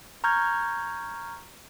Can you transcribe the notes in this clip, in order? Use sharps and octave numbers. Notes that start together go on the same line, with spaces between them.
A#5 C#6 F6 G6 G#6